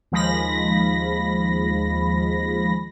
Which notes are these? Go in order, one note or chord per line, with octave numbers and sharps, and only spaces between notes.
D#2 F3 G#3 B5 A#6